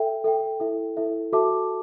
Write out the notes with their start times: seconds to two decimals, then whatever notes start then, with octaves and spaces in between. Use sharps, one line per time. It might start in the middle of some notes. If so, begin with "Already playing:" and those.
Already playing: A4 E5 G5
0.24 A4 E5 G5
0.60 E4 A4 E5
0.97 E4 A4 E5
1.33 F#4 A4 E5 A5 D6